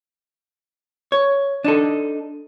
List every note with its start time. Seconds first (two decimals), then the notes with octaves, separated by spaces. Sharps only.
1.12 C#5
1.64 D4 D#4 A4